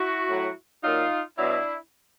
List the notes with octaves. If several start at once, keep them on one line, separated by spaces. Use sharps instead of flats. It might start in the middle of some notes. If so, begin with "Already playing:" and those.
Already playing: E4 F#4
A2 F#3
A#2 F#3 D#4 F4
B2 F#3 D4 E4